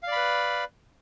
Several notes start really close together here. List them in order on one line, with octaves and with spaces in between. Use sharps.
F5 D5 B5 B4